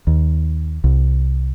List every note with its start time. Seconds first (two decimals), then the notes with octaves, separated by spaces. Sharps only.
0.07 D#2
0.84 C2